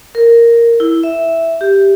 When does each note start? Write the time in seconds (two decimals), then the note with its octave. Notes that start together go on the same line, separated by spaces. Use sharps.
0.15 A#4
0.80 E4
1.03 E5
1.61 G4